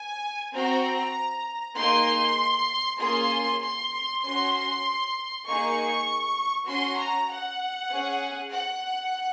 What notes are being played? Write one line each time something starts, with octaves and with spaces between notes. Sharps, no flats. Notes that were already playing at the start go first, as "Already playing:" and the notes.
Already playing: G#5
C4 F#4 A#5
A#3 D#4 G#4 C6
A#3 C#4 F4 G#4 C6
C6
C6
C#4 F#4 C6
A#3 D#4 G#4 C#6
C#4 F#4 C6
A#5
F#5
C#4 G#4
F#5